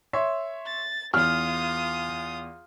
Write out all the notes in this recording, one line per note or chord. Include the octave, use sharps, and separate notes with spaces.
C#5 E5 C6
A6
E2 F4 D#6 F6